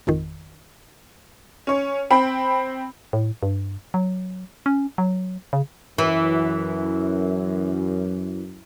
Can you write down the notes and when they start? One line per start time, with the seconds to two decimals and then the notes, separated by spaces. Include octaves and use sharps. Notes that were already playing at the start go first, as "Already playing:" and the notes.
0.07 G#1 F2 D#3
1.67 C#4 C#5
2.10 C4 G5 B5
3.13 A2
3.43 G2
3.94 F#3
4.66 C#4
4.98 F#3
5.53 C#3
5.98 F#2 E3